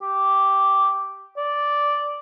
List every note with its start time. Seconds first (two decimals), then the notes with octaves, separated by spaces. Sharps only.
0.03 G4
1.37 D5